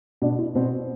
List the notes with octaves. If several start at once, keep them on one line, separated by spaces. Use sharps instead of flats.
B2 D4
E4
B2 C4